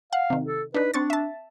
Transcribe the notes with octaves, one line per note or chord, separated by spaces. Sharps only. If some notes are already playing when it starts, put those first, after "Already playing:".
F5 F#5
C3 D#3
A4
D4 D#4 B4
C4 D4 C#6 A6
E5 A5